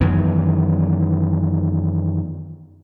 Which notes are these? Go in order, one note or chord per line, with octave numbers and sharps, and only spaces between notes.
F#2 D#3 E3 B3